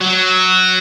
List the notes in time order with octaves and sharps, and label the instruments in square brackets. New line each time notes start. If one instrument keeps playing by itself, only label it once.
[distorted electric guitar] F#3